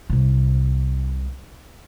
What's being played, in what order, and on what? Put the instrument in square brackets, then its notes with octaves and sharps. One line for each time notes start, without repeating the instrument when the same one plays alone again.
[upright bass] C2 C3